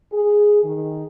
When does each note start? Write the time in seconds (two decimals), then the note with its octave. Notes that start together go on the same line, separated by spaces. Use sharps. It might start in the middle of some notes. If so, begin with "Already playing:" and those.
0.13 G#4
0.64 D#3